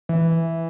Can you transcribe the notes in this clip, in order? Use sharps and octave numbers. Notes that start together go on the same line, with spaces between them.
E3